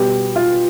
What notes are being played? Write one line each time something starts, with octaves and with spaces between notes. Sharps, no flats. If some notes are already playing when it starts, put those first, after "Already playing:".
Already playing: B2 G3 B3 G4
F4